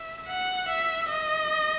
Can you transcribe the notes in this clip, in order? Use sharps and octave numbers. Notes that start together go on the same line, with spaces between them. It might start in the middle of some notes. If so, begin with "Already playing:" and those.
Already playing: E5
F#5
E5
D#5